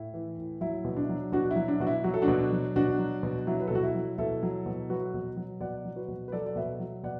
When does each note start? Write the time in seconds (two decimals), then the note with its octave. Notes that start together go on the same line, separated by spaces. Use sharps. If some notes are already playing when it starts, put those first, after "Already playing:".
Already playing: A2 E4
0.14 E3
0.38 A2
0.61 F#3 E4
0.85 B2
0.97 D4
1.09 F#3
1.32 B2 D4 F#4
1.51 E4
1.56 F#3
1.68 D4
1.80 B2 F#4
1.87 E4
2.04 F#3 F#4
2.14 A4
2.22 D4 F#4
2.28 B2
2.52 F#3
2.76 B2 D4 F#4
2.99 F#3
3.23 B2
3.47 F#3 E4
3.60 B4
3.67 A4
3.71 B2 F#4
3.83 E4
3.95 F#3
4.18 B2 E4 A4
4.43 F#3
4.66 B2
4.90 F#3 F#4 B4
5.14 B2
5.37 F#3
5.61 B2 D5 F#5
5.85 F#3
5.96 F#4 B4
6.08 B2
6.28 B4
6.32 F#3 A4 D5
6.46 D5
6.56 B2 B4 E5
6.80 F#3
7.03 B2 D5 F#5